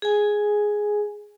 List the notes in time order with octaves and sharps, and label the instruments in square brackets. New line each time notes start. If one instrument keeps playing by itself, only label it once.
[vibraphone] G#4 G#5